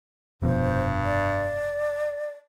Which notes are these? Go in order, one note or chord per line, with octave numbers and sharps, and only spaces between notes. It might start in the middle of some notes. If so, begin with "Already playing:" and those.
F1 G2 B2 F3 C5
D5